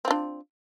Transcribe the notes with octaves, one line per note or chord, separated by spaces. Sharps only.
C4 D4 F4